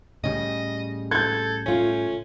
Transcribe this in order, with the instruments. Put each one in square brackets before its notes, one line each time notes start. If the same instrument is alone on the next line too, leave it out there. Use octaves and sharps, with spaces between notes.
[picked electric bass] A2 C#3 G3 [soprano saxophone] D#5
[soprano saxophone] A4 [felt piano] G6 G#6
[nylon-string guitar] A3 F4 [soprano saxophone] C#4